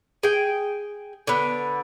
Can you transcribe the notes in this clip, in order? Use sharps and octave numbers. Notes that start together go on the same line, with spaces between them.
G#4 G5
D3 B3